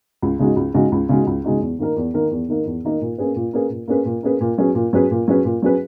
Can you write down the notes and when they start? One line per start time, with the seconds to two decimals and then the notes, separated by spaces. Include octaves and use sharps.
0.22 C#2
0.39 C#3 G#3 D#4 F#4
0.56 C#2
0.74 C#3 G#3 D#4 F#4
0.92 C#2
1.09 C#3 G#3 D#4 F#4
1.27 C#2
1.44 C#3 G#3 D#4 F#4
1.61 E2
1.79 D#3 A#3 D#4 A#4
1.96 E2
2.14 D#3 A#3 D#4 A#4
2.31 E2
2.48 D#3 A#3 D#4 A#4
2.66 E2
2.84 D#3 A#3 D#4 A#4
3.01 A#2
3.18 A#3 C#4 G#4 B4
3.36 A#2
3.53 A#3 C#4 G#4 B4
3.70 A#2
3.88 A#3 C#4 G#4 B4
4.05 A#2
4.23 A#3 C#4 G#4 B4
4.41 A#2
4.58 F#3 C#4 G#4 B4
4.75 A#2
4.93 F#3 C#4 G#4 B4
5.11 A#2
5.28 F#3 C#4 G#4 B4
5.45 A#2
5.62 F#3 C#4 G#4 B4